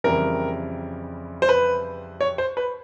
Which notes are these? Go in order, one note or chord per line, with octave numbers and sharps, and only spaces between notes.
F2 C#3 E3 G3 A#4
C5
B4
C#5
C5
B4